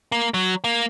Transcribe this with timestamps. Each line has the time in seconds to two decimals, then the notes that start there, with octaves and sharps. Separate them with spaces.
0.12 A#3
0.34 F#3
0.64 A#3